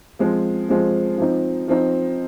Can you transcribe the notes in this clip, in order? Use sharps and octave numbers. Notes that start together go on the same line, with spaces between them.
F3 G#3 C4
F3 G#3 C4
F3 C4 D#4
F3 C4 D#4